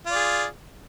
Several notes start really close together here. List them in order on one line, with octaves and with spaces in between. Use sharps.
F4 D5 G#4